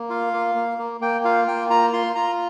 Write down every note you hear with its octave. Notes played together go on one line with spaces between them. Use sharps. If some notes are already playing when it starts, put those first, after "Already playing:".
Already playing: A#3
F4 F5
A#3
A#3
A#3
A#3 G5
F4 F5
A#3 G5
F4 A#5
F4 C6
F4 A#5